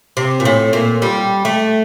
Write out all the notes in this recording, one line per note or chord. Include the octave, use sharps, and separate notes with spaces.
C3
A#2
A2
A#2
G3
A3